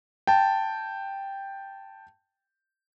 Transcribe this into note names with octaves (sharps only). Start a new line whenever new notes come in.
G5 A5